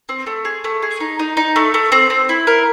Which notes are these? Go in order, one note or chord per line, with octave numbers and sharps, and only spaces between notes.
C4
A3
G#4
A3
G#4
D#4
D#4
D#4
A3
A3
C4
C4
E4
A#4